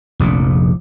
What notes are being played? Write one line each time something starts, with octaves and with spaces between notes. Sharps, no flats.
F1 A#1 A#2